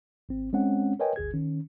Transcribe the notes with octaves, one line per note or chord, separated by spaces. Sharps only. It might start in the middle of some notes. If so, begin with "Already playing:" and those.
G#1 C4
G#3 C4 C#4 F#5
A#4 B4 C#5 D#5 G5 G#5
G1 D2 G#4 G#6
D#3 C#4